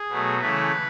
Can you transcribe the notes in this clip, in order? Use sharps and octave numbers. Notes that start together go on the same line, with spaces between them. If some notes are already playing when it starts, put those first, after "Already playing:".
Already playing: G#4
B2 F#3 A3
C#3 E3 A3 B4